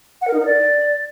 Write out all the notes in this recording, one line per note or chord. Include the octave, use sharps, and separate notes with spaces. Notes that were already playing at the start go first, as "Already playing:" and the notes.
F#5
A#4
D#4
A#4
D5